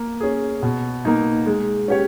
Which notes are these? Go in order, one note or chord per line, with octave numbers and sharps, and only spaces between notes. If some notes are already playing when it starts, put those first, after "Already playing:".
Already playing: A#3
C#4 G#4
B2
A#3 D#4
G#3
C#4 G4 C#5